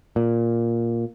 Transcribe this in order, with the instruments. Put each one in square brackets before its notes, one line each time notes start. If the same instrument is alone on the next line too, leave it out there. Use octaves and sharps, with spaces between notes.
[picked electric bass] A#2